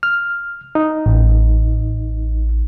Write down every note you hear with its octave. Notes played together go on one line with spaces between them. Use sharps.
F6
D#4
A1